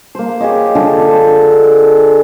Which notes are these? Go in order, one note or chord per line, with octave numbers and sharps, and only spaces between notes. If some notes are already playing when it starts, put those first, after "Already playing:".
A#3 C5
G4 G#4 C#5 D#5
D3 F4 G#4 A4
C5